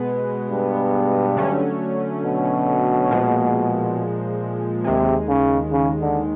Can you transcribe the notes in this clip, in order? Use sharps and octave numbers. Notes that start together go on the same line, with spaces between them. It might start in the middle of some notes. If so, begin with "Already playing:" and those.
Already playing: B2 G#3 B3
G2
D3 F#3 A3 C#4
B2
A#2 F3 G#3
D#2 C3 D#3 G#3
C#3
C#3
D3